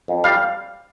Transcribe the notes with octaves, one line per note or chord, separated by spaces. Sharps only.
F2
G3 F5